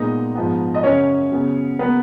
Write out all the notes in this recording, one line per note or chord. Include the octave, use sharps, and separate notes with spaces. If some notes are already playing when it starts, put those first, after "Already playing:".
Already playing: A#2 G#3 B3 D#4 D#5
G#2 F3 B3
D#5
F#2 C#3 F#3 C#4 C#5
C#3 F#3 B3
C#3 F#3 A#3 B3 B4